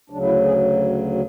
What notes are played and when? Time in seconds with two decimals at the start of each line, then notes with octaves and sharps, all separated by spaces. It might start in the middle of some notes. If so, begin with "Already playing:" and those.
0.10 D2 C#3 F#3 D4
0.22 E4
0.44 G#4